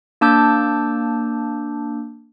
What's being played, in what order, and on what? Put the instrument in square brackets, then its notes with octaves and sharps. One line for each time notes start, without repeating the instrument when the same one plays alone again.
[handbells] A#3 D4 A5 D6 E6 G6